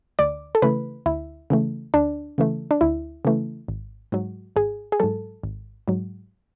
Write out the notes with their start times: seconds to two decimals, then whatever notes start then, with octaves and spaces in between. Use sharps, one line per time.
0.19 D2 D5
0.55 A4
0.62 C#3 E3 A3 B4
1.06 D2 E4
1.50 C#3 E3 A3
1.94 D2 D4
2.38 C#3 E3 A3
2.71 D4
2.81 D2 E4
3.25 C#3 E3 A3
3.68 G#1
4.12 G#2 F#3
4.56 G#1 G#4
4.92 G#4
5.00 G#2 F#3 A4
5.44 G#1
5.88 G#2 F#3